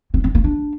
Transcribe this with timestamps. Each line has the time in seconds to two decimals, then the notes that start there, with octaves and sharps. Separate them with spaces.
0.14 C4
0.24 C4
0.35 A#3
0.44 D4